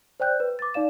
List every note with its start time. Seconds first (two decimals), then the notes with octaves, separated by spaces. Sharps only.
0.20 C5 D5 G5 F#6 G6
0.40 B4
0.59 D6 A6
0.74 D#4 D5 F5 E7